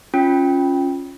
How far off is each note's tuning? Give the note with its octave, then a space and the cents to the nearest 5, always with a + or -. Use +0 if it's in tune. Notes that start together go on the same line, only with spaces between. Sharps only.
C#4 +0 F4 +5 G5 +0